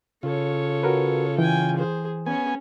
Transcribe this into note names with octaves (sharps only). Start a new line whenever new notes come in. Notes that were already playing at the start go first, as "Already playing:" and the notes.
C#3 F4 A4 C#5
F#4 A#4 B4
E3 G5 G#5
G#4 C5
B3 C#4 C#5 G#5